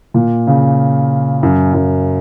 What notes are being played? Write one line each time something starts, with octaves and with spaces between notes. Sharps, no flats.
A#2
C#3
F#2
F#2